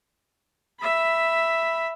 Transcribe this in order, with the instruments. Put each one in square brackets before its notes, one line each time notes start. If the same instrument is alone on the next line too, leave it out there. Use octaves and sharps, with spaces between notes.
[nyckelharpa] E5 B5